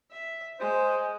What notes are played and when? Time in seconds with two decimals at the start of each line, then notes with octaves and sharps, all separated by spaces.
0.11 E5
0.60 G#3 C5